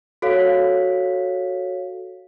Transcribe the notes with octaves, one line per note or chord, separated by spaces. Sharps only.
F#4 A4 C#5 F5 B6